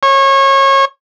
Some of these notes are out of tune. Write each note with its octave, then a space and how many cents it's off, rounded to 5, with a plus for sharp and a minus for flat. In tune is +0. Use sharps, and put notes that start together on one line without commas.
C#5 -25